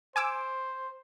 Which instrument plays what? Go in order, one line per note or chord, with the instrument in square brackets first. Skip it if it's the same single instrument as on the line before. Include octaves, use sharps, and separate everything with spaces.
[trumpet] C5 [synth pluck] G#5 D6 E6